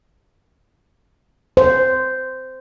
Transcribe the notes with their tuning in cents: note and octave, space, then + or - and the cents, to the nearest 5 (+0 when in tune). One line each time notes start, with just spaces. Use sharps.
C5 -10